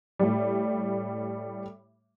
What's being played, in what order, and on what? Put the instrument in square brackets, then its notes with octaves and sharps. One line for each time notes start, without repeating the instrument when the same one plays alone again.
[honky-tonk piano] A2 G3